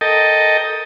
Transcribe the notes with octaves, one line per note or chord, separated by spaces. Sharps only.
A4 A#4 D#5 G5 A5